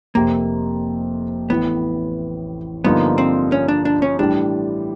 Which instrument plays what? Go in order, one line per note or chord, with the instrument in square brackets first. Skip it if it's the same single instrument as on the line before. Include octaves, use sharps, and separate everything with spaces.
[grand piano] F1 F2 C3 [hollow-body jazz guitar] A#3
[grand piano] A1 A2 E3 [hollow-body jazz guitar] B3
[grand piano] G2 D3 F3 A#3 D#4 [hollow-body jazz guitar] B3
[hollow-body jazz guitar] C4
C#4
D4
D4
C#4
[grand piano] A2 E3 G3 [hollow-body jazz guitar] D4